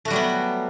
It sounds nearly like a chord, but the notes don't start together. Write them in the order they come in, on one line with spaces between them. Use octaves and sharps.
A3 F#4 G3 F#3 B3